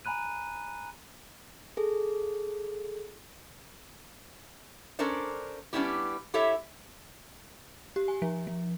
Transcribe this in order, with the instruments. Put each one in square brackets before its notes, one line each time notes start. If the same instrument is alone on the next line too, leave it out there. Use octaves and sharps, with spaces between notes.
[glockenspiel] G#5 A#5 B5 F#6 D#7
[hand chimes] G#4 A4
[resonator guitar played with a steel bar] C#4 D4 A4 A#4 C5 D5
G3 B3 C#4 D4 E4 G4
E4 G4 A4 C#5 E5
[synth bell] G4
G#5
F3
F3